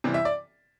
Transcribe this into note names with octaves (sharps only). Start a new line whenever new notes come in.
C3 E3 G3
E5
D5